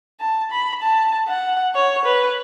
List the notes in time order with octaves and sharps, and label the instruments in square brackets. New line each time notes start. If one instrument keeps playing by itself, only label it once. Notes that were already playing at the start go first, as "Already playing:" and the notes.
[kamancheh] A5
B5
A5
F#5
C#5
B4